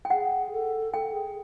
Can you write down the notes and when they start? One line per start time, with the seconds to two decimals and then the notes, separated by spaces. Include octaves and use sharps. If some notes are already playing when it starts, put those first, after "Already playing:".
0.05 G5
0.10 G#4 F#5
0.52 A4
0.94 A4 G5
1.13 G#4